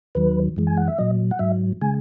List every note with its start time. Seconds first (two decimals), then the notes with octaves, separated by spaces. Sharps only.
0.15 D#2 D#3 F#3 B4
0.57 F#2 E3 G#3
0.67 G#5
0.77 F#5
0.88 E5
0.99 A#2 F#3 D#5
1.31 F#5
1.39 G#2 F#3 E5
1.81 C#3 G#3 G#5